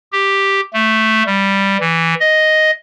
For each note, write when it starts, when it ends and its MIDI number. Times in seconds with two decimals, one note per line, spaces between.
0.12 0.61 67
0.73 1.23 57
1.26 1.77 55
1.80 2.14 52
2.20 2.71 75